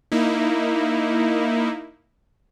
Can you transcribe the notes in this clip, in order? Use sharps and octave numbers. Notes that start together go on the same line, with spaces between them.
A#3 D#4 E4